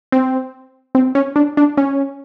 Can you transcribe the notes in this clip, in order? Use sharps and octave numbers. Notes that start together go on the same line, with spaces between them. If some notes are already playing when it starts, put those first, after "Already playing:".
C4
C4
C#4
D4
D4
C#4